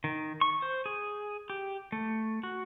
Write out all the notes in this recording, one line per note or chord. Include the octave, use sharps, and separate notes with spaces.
D#3
C#6
C5
G#4
G4
A3
F#4